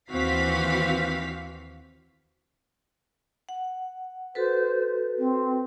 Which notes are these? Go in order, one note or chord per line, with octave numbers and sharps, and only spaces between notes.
D#2 E3 C4 F#4 F5 B6
F#5
F#4 A4 B4 C5
C4